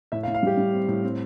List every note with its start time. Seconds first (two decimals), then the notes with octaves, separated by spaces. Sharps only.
0.12 A2 E5
0.23 F5
0.28 A2
0.34 F5
0.43 G3 G4
0.58 G3
0.72 C4
0.88 A2
1.03 C4